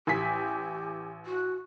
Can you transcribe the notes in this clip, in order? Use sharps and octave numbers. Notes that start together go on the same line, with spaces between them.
A1 G4 G#5 B6
F#4